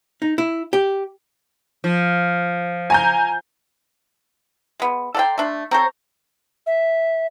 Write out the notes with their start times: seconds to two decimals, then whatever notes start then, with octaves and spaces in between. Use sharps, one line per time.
0.22 D#4
0.38 E4
0.73 G4
1.84 F3
2.90 G#5 A#5 G6
4.80 G#3 B3
5.15 A4 D5 F#5 G5 A#5 C6
5.38 A3 D4
5.71 C4 A4 C5 C#5 A#5
6.66 E5